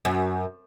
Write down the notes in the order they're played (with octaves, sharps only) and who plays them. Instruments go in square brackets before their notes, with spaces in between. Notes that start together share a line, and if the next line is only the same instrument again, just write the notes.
[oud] F#2